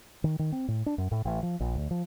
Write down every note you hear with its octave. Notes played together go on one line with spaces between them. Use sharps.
D#3
D#3
C4
A2
D4
F#2
A2
A1
F3
A#1
D2
F3